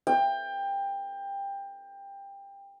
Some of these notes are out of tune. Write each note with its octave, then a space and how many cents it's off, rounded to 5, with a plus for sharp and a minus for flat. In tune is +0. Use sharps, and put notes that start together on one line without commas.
G5 +20